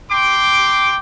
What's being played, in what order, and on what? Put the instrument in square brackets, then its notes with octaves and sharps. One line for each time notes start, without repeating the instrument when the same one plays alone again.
[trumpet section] G5 C6 D6